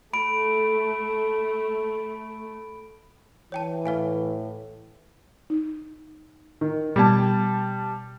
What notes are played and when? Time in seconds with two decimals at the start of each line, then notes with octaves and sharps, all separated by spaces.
0.13 A3 B5 D7
3.52 E3 C#5 G5 A5
3.86 A2 B4 F5 G#5
5.50 D#4
6.61 D#3
6.96 B2 G3 B3 A5 G#6